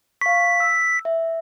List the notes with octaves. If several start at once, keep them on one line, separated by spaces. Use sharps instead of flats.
F5 C#6 B6
E6
E5